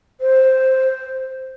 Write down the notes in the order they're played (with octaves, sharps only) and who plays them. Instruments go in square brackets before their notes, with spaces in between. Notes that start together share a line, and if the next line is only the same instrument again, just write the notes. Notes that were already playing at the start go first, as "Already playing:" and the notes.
[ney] C5